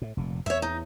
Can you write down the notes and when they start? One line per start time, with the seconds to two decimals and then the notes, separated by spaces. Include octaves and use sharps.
0.02 A2
0.17 F1 A#2
0.46 E2 C#5 E5
0.62 D#4